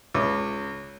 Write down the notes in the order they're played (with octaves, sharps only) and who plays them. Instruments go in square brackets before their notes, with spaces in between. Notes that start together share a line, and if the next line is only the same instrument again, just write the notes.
[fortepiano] C#2